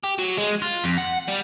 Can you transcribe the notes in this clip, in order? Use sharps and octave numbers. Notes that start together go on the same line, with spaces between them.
G4
F#3
G#3
F4
F2
F#5
G3